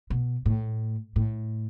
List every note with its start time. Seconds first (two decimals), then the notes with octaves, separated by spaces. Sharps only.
0.10 B2
0.46 A2
1.16 A2